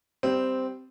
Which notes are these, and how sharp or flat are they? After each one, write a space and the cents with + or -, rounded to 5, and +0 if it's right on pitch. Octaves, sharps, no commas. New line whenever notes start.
G3 +0 C4 -10 F5 -45